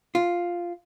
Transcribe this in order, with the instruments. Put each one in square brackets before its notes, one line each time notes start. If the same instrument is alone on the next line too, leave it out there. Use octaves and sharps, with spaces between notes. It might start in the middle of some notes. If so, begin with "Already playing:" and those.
[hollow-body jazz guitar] F4